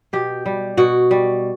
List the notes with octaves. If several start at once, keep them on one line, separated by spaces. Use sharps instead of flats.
B2 G4
G3
B2 F#4
G3